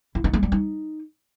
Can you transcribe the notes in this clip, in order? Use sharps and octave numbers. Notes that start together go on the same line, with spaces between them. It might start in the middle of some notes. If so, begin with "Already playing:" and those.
E4
D#4
G#3
G3
D#4